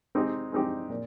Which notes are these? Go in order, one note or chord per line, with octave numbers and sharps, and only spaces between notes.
G#3 C4 D#4 G4
G#3 C4 D#4 G4
A#2